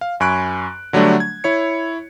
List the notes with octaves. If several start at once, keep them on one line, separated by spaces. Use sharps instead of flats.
F5
F#2 G#5 B5 C#6 F#6 D7
D3 F#3 G3 A3 D4
G#6
E4 C#5 C#7